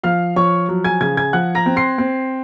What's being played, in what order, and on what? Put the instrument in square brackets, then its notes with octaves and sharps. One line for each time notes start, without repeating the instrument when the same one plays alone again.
[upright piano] F3 F5 F6
F3 C#5 C#6
F#3
G#5 G#6
C#3 G#5 G#6
G#5 G#6
F3 F#5 F#6
A#5 A#6
C4
C6 C7
C4